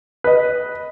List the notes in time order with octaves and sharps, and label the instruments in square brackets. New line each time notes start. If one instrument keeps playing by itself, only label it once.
[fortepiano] B4 D#5